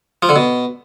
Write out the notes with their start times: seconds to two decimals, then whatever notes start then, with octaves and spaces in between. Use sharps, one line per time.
0.22 F3
0.29 D3
0.36 B2